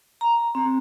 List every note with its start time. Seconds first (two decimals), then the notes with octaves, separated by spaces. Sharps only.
0.21 A#5
0.55 C4